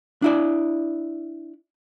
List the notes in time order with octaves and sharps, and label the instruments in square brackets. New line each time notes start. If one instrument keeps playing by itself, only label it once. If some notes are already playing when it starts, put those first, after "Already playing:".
[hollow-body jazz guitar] D4 E4 D5